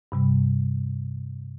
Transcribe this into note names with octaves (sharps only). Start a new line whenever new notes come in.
G2 C3 G3